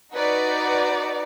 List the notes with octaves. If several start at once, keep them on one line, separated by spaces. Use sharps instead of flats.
D#4 F#4 B4 D5